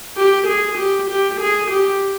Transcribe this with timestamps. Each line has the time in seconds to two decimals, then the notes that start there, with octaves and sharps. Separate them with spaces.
0.17 G4
0.47 G#4
0.78 G4
1.10 G4
1.41 G#4
1.71 G4